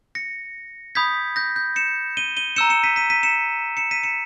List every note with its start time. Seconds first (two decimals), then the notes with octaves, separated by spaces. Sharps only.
0.15 A#6 C#7
0.95 B5 D#6 G6 G#6 B6
1.36 G6 A#6
1.56 G6
1.76 C#7 E7
2.17 D#7 G7
2.37 D#7 G7
2.56 A#5 E6 G6 C#7 E7
2.70 C#7 E7
2.83 B6 D#7
2.96 B6 D#7
3.10 B6 D#7
3.23 C#7 E7
3.77 C#7 E7
3.91 B6 D#7
4.03 C#7 E7